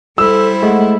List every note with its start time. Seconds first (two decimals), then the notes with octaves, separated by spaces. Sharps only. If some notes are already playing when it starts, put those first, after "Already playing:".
0.18 G3 E4 A4 C5 E6
0.63 G#3 A3 F#5